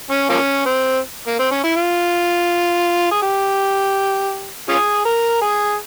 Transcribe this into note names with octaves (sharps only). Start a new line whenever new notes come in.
C#4
F3 A#3 C#4
C4
A#3
C4
C#4
E4
F4
G#4
G4
C#4 F4 G#4
A#4
G#4